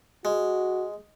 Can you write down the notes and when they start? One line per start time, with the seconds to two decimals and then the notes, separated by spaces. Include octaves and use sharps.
0.25 G#3 F#4